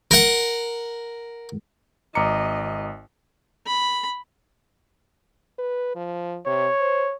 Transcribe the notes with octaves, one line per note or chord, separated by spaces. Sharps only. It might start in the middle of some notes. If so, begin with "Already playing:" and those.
A#4 F#5
G#1 D#5 A#5 D6 C#7
B5
B4
F3
C3 C#5
C5